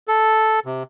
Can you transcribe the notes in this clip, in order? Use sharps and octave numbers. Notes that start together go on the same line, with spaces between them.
A4
C3